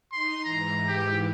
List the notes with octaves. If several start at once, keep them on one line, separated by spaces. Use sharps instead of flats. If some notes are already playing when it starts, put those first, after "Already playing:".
D#4 C6
G#2 E3 A#5
G4